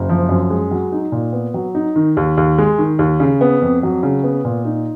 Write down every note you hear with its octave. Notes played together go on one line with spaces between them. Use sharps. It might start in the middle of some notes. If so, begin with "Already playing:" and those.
Already playing: F#1
F3
F#2
G#3
F#3
D#4
A#2
B3
F#3
D#4
D#3
D#2
D#2
G#3
D#3
D#2
C#3
B3
F2
F#3
C#3
B3
A#2
D#4